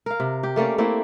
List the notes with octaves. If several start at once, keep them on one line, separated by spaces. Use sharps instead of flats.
A#4 F5
C3
G4
A3 A#3 C#4 D5
A3 A#3 C4 E4